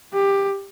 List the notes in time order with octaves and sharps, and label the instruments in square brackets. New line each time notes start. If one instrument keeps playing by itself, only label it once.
[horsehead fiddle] G4